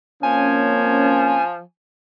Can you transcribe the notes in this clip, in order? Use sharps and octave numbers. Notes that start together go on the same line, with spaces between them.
F3 A#3 C4 C#4 G#5